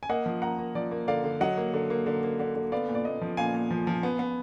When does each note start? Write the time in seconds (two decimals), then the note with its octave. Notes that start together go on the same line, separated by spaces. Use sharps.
0.03 G#5
0.09 A#3 D#5 F#5
0.26 F3
0.42 A#3 F#5 A#5
0.58 A#3
0.75 F3 D5
0.91 A#3
1.08 D3 D5 F5
1.24 D3
1.41 F#3 D#5 F#5
1.57 A#3
1.73 D3
1.90 A#3
2.06 D3
2.23 A#3
2.39 D3
2.55 D3
2.72 B3 D5 F5
2.89 A#2
2.95 D5
3.05 A#2 D#5
3.21 F3
3.37 A#2 F5 G#5
3.54 A#2
3.71 F3
3.87 F3
4.03 B3
4.19 B3